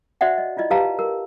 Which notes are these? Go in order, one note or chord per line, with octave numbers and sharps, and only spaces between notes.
F#4 C5 D5 E5 F#5
D#5
E4 F4 D5 D#5
G4 B4 F5 A5 A#5
A#4